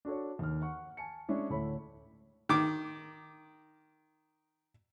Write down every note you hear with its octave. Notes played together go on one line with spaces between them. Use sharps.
D4 F#4 A4 C#5
D#2 F6
F#5 C#6
G#5 A5 C#7
G#3 C#4 D4 E4
D2 A2 A3 C#5 B5
D#3 D6